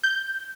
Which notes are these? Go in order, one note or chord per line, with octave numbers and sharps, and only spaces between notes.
G6